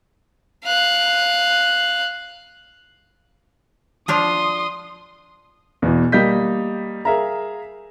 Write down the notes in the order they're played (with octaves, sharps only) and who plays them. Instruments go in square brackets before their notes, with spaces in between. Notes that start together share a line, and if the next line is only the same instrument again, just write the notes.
[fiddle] F5 F#6
[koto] F3 D4 F4 [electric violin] C6 D#6
[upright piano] E2 B2 E3
G3 A#3 D#5 G6 B6
G#4 A#4 E5 F5 A#5